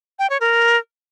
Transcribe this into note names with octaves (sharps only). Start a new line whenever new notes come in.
G5
C#5
A#4